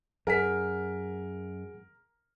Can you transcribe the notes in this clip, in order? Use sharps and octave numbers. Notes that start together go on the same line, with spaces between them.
F#2 G#4 A#4 F#5 G#5 B6